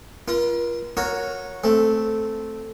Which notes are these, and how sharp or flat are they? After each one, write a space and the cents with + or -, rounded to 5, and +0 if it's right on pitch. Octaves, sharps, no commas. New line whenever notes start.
F4 -20 A#4 +40
F#4 -15 A#4 +0 C#5 +0
A3 +0 C4 +0